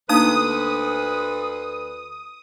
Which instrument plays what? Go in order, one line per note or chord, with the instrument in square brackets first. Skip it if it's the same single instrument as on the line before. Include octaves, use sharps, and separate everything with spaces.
[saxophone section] D2 B4 [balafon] A#3 D4 D#4 [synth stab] D#6